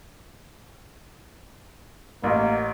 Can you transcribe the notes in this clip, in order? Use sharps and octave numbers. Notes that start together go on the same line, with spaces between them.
A1 A#3